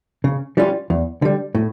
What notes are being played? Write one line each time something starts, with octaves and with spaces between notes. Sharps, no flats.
C#3
E3 G3 C#4 F4
E2
D3 G3
A2